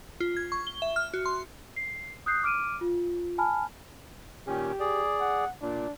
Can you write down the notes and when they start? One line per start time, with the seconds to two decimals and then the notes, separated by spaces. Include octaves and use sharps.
0.20 F4
0.37 G#6
0.52 C#6
0.67 G7
0.82 E5
0.96 F6
1.14 F#4
1.26 C6
1.76 C7
2.26 D#6 F#6 G6 C7
2.43 D6 F6 D7 D#7
2.81 F4
3.38 G#5 A5 B5 F6
4.47 A#2 D#3 C#4 G4
4.80 G#4 D5
5.20 F#5
5.62 A#2 D4